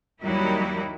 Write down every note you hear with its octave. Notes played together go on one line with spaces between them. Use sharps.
D#2 F#3 G3 A#3 D#4 E4